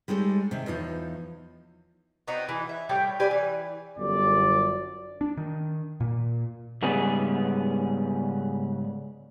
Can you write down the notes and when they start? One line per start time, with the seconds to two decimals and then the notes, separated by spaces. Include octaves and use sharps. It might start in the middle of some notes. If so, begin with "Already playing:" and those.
0.08 G3 G#3 D#4 A4 C#5
0.51 C3 D#3
0.66 E2 F3 D#4 C#5
2.28 B3 C4 D#4 F#4
2.49 E3
2.69 E5
2.89 A2 G3 C#5 G5
3.20 G4 B4 D5 G#5
3.31 E3
3.97 G1 F#2 D5
5.21 D4
5.37 D#3
6.00 A#2
6.82 G#2 C#3 G3 B3 C#4 G#4